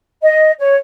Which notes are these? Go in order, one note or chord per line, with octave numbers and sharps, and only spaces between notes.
D#5
C#5